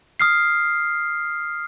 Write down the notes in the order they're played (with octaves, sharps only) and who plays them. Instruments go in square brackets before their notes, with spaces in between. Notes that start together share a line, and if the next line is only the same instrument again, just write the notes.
[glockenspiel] D#6 F6 C7